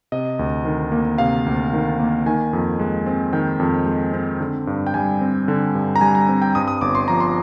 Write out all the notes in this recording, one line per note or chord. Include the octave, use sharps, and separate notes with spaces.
C3 D#5
D2
D#3
A#3
C3 F5
D2
D#3
A#3
D#3 G#5
F2
G#3
C4
D#3 G5
F2
G#3
C4
D3
G2
G5
G3 G#5
C4
D3
G2
A#5
G3 G#5
A#5
C4
G5
G2 D#6
D#6
G1 D6
C6
F3 A#5
C6